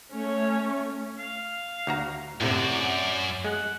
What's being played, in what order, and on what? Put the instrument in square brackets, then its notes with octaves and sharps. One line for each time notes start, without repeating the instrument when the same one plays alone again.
[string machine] A3 [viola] C#4 C#5
[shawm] F5
[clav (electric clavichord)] D2 F#4 A#5
[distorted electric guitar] F#2 [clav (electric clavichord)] A2 C3 [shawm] D5
[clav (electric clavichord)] G#3 [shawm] F#5